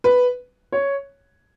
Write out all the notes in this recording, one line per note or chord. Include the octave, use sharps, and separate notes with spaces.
B4
C#5